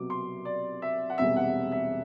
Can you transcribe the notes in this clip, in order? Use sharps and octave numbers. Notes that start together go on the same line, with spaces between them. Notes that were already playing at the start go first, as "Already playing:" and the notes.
Already playing: C2 B2 F#3 D6
C6
D5
E5
F#5
E1 E2 C3 G3 E5
F#5
E5